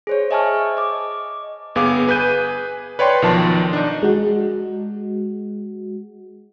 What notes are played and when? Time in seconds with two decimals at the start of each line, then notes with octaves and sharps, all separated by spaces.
0.07 G#4 C5 C#5
0.31 D#5 E5 G#5 A5 C#6 F6
0.77 D#5 D6
1.75 G1 B3 G#4 F5 D6
2.07 G#4 B4 G#5 G6 D#7
2.99 B4 C#5 D5 G5 C6
3.22 B1 D#3 F3 A5
3.73 D4 D#4
4.03 G#3 F#4